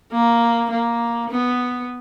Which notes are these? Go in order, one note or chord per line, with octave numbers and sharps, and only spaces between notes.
A#3
A#3
B3